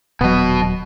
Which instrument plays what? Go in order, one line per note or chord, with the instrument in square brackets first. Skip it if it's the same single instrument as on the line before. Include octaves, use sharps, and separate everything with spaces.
[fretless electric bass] D#1 F#3 [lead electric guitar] B2 D#5 [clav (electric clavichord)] B3